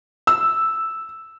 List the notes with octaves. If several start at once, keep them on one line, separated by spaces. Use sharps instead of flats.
E6